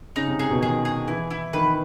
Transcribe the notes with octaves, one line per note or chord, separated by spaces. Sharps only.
C#3 D#4
C3
C3 G#4
B2
D#3 G#4
G#4
E3 E4
E4
D#3 B4